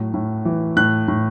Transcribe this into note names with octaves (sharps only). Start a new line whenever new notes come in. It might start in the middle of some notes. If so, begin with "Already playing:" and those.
Already playing: A2 F#3
A2
E3
A2 F#6
A2